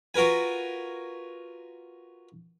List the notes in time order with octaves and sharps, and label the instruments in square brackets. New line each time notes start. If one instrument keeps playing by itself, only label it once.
[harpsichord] F4 F#4 A#4 B4 G#5